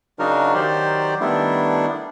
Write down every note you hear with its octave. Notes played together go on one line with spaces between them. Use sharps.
C#3 F#3 D4 D#4 F#4 A#4
D#3 F#3 G4 C5 D5
D#3 G3 A3 B3 D4 E4